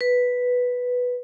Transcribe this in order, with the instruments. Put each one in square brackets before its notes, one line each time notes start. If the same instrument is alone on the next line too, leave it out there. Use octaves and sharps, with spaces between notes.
[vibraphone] B4